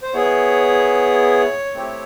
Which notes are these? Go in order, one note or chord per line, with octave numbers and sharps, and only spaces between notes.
C5
B3 E4 G#4 C#5
A3 C4 E4 G4